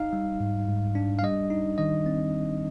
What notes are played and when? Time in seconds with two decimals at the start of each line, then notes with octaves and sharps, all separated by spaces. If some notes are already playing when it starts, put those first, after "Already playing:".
Already playing: D#4 F5
0.13 G3
0.40 G#2
0.68 G#2
0.95 D4
1.19 F5
1.23 G3 D#5
1.50 D#4
1.78 D#3 D#5
2.06 C4